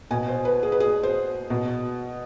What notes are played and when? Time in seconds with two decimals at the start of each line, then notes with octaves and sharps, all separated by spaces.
0.11 B2 G#5
0.28 C5
0.45 B4
0.63 G#4
0.72 B4
0.80 G#4
1.03 C5
1.50 B2